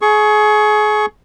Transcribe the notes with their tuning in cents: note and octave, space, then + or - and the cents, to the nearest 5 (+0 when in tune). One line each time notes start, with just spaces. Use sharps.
G#4 +30 C#6 +0